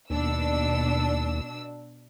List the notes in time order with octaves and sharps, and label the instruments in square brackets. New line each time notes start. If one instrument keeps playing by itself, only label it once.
[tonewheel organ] D#2 [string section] B2 D4 E6